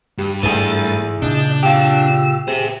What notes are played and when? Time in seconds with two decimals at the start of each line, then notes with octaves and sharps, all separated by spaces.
0.18 G2 G4
0.43 G#2 E3 A3 G#4 A6
1.22 A#2 C#3 D4 D#5 G6
1.63 F4 G4 E6
2.48 G4 G#4 C5 E5